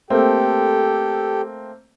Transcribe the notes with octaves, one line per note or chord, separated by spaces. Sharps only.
A3 A#3 C4 G4 A4 G5